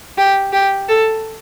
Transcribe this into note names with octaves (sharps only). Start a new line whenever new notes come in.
G4
G4
A4